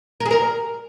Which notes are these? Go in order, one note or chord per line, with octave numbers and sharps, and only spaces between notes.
A#4
G#4
A#4